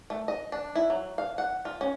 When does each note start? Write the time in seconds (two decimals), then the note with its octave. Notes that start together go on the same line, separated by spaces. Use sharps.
0.10 A3
0.28 D#5
0.52 D4
0.75 E4
0.90 F#3
1.18 F5
1.38 F#5
1.65 F4
1.81 C#4